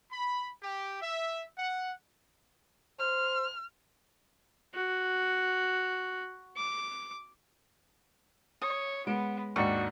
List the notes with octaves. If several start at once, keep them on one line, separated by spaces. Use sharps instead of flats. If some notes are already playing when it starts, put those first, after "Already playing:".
B5
G4
E5
F#5
C5 F6
F#4
D6
C#5 D#6
G#3 B3 D7
D#2 G#2 D4 F#4 C#6